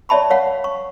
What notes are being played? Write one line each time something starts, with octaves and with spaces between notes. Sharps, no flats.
C#5 D5 E5 A5 B5 C#6
C#5 F5 F#5
C#6